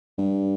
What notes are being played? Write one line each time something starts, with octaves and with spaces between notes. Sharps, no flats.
G2